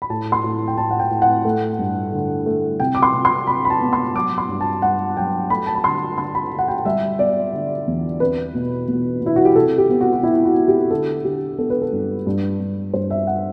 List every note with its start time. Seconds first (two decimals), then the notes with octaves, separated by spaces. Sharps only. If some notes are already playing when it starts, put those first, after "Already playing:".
0.02 B5
0.10 A2 A5
0.32 C6
0.44 A2
0.68 G5
0.77 A2 A5
0.91 F#5
1.00 G5
1.11 A2
1.22 F#5
1.45 A3
1.79 G2
2.12 D3
2.46 A3
2.80 C3 G5
2.95 D6
3.03 C6
3.14 C3
3.25 C6
3.47 C3 B5
3.65 B5
3.70 A5
3.81 B3
3.93 C6
4.15 F#3 D6
4.38 C6
4.49 G2
4.61 A5
4.82 G2 F#5
5.17 F#3 G5
5.50 A3 B5
5.67 A5
5.75 B5
5.84 D3 C6
6.18 D3 C6
6.35 B5
6.52 D3
6.59 F#5
6.68 G5
6.85 G3 E5
7.19 B3 D5
7.53 D3
7.87 E2
8.20 C4 B4
8.55 B2
8.88 B2
9.22 B2 E4
9.36 F#4
9.45 G4
9.55 C3 A4
9.78 G4
9.90 B3
10.01 F#4
10.13 F#4
10.23 B3 E4
10.45 F#4
10.57 B3
10.68 G4
10.91 D3 A4
11.24 D3 G4
11.58 B3 A4
11.70 B4
11.82 A4
11.93 G2
12.26 G2
12.60 G2
12.94 G2 C5
13.10 E5
13.27 F#5